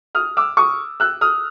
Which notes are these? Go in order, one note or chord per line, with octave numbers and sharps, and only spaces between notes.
D#6 F6
D6 E6
C#6 D#6
E6 F#6
D#6 F6